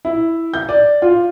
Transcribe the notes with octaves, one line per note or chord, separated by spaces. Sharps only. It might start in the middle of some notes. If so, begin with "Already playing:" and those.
E4
G6
D5
F4